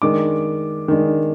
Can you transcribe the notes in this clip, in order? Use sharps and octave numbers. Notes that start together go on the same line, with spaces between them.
D#3 G#3 D4 D6
D#3 G#3 D4